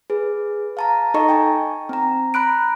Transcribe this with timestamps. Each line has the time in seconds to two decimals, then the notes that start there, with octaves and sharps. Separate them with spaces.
0.10 G#4 B4
0.77 F5 A5 A#5
1.14 D#4 A4 D#5 A5 A#5 C#6
1.29 G5 G#5 C#6
1.89 C4 A#5
2.34 A#5 B5 F#6 D7